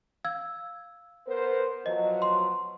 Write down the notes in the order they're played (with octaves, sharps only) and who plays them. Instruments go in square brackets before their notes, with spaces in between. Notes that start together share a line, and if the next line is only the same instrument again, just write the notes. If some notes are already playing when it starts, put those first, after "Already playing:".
[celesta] F5 E6 G#6
[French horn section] B3 A#4 C5
[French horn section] B2 F3 F#3 [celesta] D#5
[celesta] C6